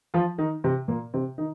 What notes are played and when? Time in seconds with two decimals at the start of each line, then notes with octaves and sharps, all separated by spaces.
0.14 F3 F4
0.38 D#3 D#4
0.64 C3 C4
0.88 A#2 A#3
1.14 C3 C4
1.38 D#3 D#4